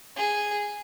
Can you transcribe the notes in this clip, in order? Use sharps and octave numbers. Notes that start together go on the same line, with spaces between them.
G#4